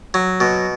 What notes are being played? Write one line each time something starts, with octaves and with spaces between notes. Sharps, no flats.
F#3
B2